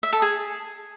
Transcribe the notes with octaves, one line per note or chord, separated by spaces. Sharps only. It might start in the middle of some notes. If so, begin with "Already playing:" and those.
E5
A4
G#4